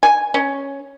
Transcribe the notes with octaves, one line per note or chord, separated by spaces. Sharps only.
G#5
C#4